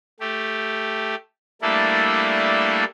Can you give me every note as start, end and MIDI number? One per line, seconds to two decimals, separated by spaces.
0.20 1.15 57
0.20 1.15 67
1.62 2.84 55
1.62 2.84 57
1.62 2.84 58
1.62 2.84 62
1.62 2.84 64
1.62 2.84 69